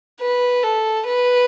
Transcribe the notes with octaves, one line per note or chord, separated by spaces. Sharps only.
B4
A4
B4